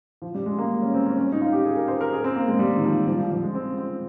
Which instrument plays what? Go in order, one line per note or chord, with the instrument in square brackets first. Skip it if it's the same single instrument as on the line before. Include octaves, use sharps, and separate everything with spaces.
[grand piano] F3
G3
G#3
A#3
C#4
C4
C#4
C#4
D#4
F4
G4
G#4
A#4
C5
A#4
G#4
C4
A#3
G#3
G3
D#3
F3
F3
F3
F3
G#3
C4
C4